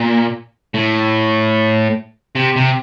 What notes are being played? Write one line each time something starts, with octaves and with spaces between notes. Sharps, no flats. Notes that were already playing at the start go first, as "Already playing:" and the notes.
Already playing: A#2
A2
C3
C3